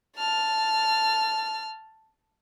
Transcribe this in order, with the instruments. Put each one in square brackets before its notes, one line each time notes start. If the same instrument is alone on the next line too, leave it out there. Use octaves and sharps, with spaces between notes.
[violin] A5 F6